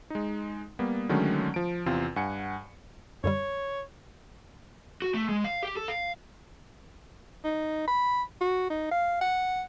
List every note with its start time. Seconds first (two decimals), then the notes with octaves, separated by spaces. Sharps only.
0.10 G#3 D#4
0.79 G3 A#3 B3
1.09 D3 D#3 F#3 G#3 A3 C#4
1.54 F3 D7
1.86 E2 C3 C4 F4
2.16 G2 F#5 G#5 C#7
3.24 F#2 D3 G3 C#5
5.02 F#4
5.14 A3
5.29 G#3
5.44 F5
5.63 G4
5.76 A4
5.88 F5
7.44 D#4
7.88 B5
8.41 F#4
8.70 D#4
8.92 F5
9.21 F#5